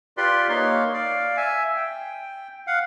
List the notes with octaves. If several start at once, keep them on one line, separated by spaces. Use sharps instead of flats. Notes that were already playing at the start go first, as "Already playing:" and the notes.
F4 G4 B4 D5 C6
A#3 D#4 C#5 C6
D5 F5
E5 G#5
G5
F5 F#5